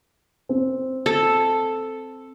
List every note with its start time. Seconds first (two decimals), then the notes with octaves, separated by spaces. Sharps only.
0.49 C4
1.06 A4